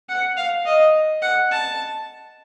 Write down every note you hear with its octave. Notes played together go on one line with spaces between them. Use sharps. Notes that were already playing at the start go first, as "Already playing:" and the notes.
F#5
F5
D#5
F#5
A5